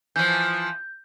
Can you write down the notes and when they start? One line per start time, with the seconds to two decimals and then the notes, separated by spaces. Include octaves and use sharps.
0.16 E3 F3 G6